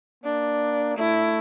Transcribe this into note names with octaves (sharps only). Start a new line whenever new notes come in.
A#3 D4
A3 E4